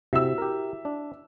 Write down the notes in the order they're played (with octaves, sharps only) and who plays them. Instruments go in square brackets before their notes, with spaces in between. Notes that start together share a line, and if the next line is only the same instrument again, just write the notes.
[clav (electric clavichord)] C3 [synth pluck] E4 F#4 [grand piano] E5 E6
[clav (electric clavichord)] G4 A#4
D4